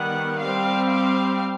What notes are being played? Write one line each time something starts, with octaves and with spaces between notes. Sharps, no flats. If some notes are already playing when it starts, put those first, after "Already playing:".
Already playing: D#3 G3 B3 F#5
G3 C4 F5
F5